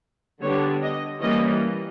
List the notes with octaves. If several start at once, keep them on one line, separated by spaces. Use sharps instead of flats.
D3 G3 B3 D4 C#5
D#5
E3 G3 A#3 C#4 D#5